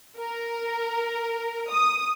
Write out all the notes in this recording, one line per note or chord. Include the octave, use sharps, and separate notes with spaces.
A#4
D#6